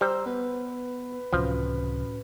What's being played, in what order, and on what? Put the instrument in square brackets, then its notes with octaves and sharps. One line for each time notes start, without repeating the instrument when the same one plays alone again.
[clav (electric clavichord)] G3 [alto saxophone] C5 [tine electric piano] A#5 E6
[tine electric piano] B3 [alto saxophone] B4
[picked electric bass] C#2 C3 E3 [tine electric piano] A2 C#4 F#4 [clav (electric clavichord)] F3